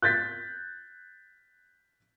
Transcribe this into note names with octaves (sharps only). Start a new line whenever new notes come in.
F#6 G6 A6 B6